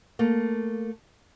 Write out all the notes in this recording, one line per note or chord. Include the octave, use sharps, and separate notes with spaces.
A3 A#3